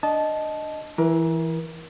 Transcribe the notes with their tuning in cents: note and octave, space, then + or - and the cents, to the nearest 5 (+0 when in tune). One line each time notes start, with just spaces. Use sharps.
D4 +0 D#5 +0 A5 -15
E3 +0 A#4 +30